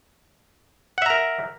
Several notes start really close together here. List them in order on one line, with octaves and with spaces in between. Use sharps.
F#5 E5 A#5 A#4